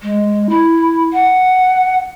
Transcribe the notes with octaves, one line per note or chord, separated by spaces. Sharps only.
G#3
E4
F#5